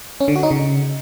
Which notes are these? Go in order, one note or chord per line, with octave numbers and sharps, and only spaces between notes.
C#4
D3
F#4
D#4
C#3